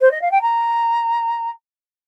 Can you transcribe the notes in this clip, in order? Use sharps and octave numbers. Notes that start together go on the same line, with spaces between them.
C5
D#5
F5
G5
A#5